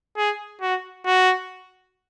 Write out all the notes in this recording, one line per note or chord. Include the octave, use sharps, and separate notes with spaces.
G#4
F#4
F#4